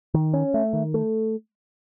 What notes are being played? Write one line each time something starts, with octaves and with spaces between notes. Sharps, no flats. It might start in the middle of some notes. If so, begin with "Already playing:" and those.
D#3
C#4
A3
D#3
A3